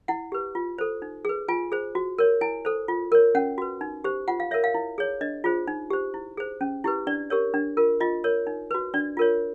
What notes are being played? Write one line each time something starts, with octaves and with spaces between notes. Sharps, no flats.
E4 F#5
G4 B4
F4
A4 C5
D#4
G#4 B4
F4 G#5
G#4 C5
F#4
A#4 C#5
E4 G#5
A4 C5
F4
A#4 C#5
C#4 F#5
F#4 B4
D#4
G4 C5
F4 F#5
F5
A#4 C#5 E5
F5
E4
G#4 C#5
D4 D#5
F4 G#4 C5
D#4
G4 C5
E4
G#4 C5
C#4
E4 G4 B4
D4 D5
G4 A#4 C#5
D4
F4 A#4
F4 D#5
A#4 C#5
D#4
F#4 B4
D4 D5
F4 A#4 C#5